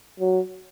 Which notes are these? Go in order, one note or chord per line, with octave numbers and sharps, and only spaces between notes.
F#3